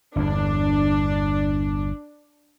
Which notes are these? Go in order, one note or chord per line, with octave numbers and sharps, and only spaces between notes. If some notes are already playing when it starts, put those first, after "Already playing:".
G1 E2 D4